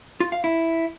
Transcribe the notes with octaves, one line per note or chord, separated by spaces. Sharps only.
F4
F5
E4